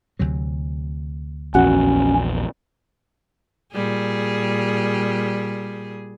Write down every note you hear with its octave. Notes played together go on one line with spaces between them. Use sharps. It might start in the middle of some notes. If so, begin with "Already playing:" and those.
D2 C3 F#3
A#1 E2 C#4 F#4
A#2 G3 G#4